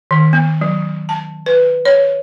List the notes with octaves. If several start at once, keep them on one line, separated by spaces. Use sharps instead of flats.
D#3
B3
F#3
A5
B4
C#5